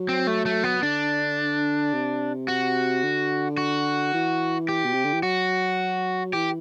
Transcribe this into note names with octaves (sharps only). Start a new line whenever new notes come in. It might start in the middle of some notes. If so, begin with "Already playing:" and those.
Already playing: F#3
C4
A3
A3
B3
D3 D4
C3
F#4
D3
F#4
E3
G4
B2
C3
D3
E3
F#3 F#4
E3 G4